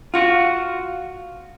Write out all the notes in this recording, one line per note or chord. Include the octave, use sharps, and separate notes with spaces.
F4 F#4